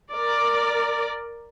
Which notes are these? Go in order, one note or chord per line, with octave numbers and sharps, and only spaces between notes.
A#4 D5